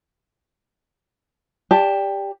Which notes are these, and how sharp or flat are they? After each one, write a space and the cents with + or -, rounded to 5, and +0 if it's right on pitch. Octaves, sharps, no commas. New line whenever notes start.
G4 +15 D5 -10 A5 +0